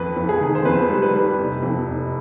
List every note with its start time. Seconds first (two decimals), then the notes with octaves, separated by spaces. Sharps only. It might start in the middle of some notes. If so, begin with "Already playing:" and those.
Already playing: F2 B4
0.16 F2
0.29 G#4
0.41 D#3
0.55 C5
0.65 F2 B4
0.90 G3
1.02 B4
1.15 G3
1.39 F1
1.62 F2
1.86 F1